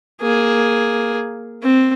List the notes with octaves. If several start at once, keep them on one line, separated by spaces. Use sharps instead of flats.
A#3 G#4
C4